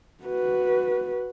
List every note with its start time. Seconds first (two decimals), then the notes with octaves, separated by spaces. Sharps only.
0.24 F#4 B4